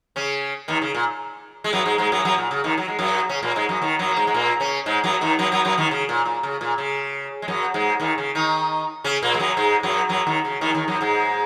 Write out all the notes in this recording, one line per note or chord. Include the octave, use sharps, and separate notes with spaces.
C#3 C#4
D#2 D#3
C#3
A#2
G#3
F#2 F#3
G#2 G#3
G#2 G#3
F#2 F#3
F#2 F#3
A#2
C#3
D#2 D#3
F#3
G#3
F#2 F#3
C#3 C#4
A#2 A#3
G#2 G#3
F#2 F#3
D#2 D#3
F#2 F#3
A#3
G#2 G#3
G#3
A#2 A#3
C#3 C#4
G#2 G#3
F#2 F#3
D#2 D#3
F#2 F#3
F#2 F#3
F#2 F#3
D#2 D#3
C#3
A#2
A#2
C#3
A#2
C#3
G#3
F#2 F#3
G#2 G#3
D#2 D#3
C#3
D#3 D#4
C#3 C#4
A#2 A#3
G#3
F#2 F#3
G#2 G#3
F#2 F#3
F#2 F#3
D#2 D#3
C#3
D#2 D#3
D#2 D#3
F#2 F#3
G#2 G#3